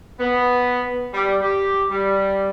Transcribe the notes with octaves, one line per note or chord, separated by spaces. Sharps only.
B3
G3
G4
G3